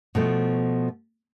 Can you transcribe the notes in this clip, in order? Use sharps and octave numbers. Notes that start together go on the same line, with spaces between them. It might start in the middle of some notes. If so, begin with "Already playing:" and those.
B2 F3 A3